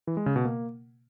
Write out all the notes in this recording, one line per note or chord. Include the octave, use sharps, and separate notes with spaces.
E3
G#3
C#3
B2
A#3